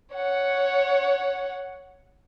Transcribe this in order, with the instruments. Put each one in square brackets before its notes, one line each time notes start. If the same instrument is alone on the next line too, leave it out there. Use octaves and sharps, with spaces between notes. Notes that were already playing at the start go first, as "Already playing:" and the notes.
[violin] C#5 F#5